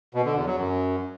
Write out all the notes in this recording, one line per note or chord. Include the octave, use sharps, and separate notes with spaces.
B2
D3
E2
F#3
F#2